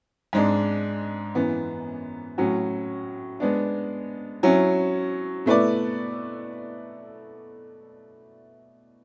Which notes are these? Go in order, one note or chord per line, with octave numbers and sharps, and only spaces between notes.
G#2 G#3 D4
F#2 E3 B3
A2 F#3 C#4 F#4
G#3 B3 D4
F#3 C#4 E4
B2 A3 E4 B4 D5